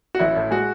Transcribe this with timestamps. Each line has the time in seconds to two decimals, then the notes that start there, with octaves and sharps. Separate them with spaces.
0.15 F#4
0.19 A1 E4
0.36 A2
0.51 G#3 F#4